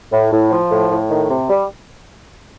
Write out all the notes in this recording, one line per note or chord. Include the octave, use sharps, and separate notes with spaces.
A2
A2
F3
A2
A2
D#3
C3
G3